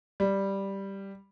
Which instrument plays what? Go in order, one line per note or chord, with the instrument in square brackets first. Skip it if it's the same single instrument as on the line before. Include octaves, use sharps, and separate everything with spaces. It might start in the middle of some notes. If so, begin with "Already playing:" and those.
[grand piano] G3